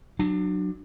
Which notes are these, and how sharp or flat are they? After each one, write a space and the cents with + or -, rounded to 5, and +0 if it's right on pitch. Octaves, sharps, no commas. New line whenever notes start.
F#3 +0 D4 +25